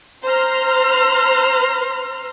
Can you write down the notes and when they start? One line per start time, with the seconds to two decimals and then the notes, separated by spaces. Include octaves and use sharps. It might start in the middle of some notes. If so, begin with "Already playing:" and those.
0.23 C5 A#5 C6 F6